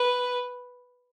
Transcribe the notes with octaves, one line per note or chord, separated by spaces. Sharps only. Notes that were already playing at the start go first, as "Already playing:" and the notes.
Already playing: B4